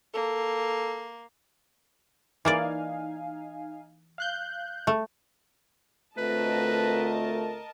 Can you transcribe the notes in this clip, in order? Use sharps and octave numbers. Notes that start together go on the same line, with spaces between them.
A#3 A4
E3 A#3 D#4 D5 F5 G#5
F5 F#6 G6
A3
D2 A3 C4 F4 A#4 B4 D#5 A5